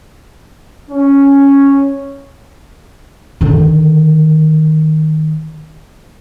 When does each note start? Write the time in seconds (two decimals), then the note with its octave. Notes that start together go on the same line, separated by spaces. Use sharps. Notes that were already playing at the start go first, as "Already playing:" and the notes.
0.91 C#4
3.41 D3 D#3